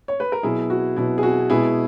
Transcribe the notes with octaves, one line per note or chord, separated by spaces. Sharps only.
C#5
B4
A#4
B2 F#3 B3 E4 G#4
F#4
B2 F#3 B3 E4
G#4
F#4
B2 G#3 B3 E4 G#4